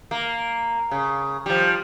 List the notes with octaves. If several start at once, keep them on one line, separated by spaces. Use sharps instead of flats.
A#3
C#3
F3 G3